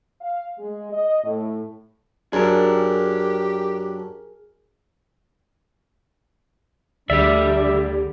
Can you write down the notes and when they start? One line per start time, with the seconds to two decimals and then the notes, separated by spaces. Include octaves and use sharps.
0.21 F5
0.58 G#3
0.92 D#5
1.24 A2
2.33 F#2 D4 G4 G#4 A#4
7.10 D2 D3 G3 G4 G#4 D5 E5